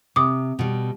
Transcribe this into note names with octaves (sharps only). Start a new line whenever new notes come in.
C3 D6 D#6
B2 G3